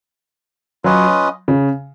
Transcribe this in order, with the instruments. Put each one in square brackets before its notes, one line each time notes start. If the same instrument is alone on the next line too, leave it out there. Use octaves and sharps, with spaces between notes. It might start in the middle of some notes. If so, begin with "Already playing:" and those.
[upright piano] F#3 [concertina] C#4 F4 B4 D#5
[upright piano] C#3